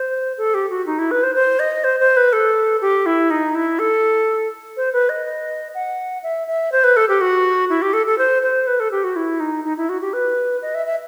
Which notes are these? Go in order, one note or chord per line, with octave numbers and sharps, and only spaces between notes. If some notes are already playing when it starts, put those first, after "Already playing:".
Already playing: C5
A4
G4
F#4
D#4
E4
B4
C5
C5
D#5
C5
C5
B4
A4
G4
E4
D#4
E4
A4
C5
B4
D#5
F#5
E5
E5
C5
B4
A4
G4
F#4
E4
G4
A4
A4
C5
C5
B4
A4
G4
F#4
E4
D#4
D#4
E4
F#4
G4
B4
D#5
E5
E5